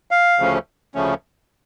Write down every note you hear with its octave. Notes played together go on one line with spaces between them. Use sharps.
F5
D2 C#3 F3 A3 C#4
D2 C#3 F3 A3 C#4